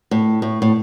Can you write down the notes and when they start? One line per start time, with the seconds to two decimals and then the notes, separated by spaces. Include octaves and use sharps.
0.11 A2
0.42 A2
0.62 A2